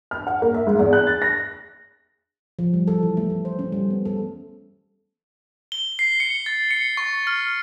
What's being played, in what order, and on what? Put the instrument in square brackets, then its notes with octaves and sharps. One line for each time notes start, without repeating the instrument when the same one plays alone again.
[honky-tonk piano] F6
F#5
A#3
E5
G#2
E2
F#6
A6
A#6
[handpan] F3
G3
A4
E3
A3
A3
C5
C#4
G3
B3
A4
[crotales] G7
C7
C#7
A6
C#7
C#6
F6